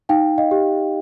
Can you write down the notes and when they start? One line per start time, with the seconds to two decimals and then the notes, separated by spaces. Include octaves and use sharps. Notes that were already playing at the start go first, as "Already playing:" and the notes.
0.09 D#4 F5 G5
0.38 D#5 F5
0.51 G4